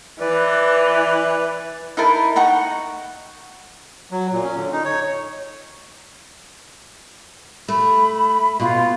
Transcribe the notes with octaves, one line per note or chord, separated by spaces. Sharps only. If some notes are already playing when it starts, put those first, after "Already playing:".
E3 B4 D5
D#4 E4 A#4 A5
D#4 F#5 A#5 C#6
F#3
A#2
C#4
D3
D#4
C#5
A3 B5
B2 F4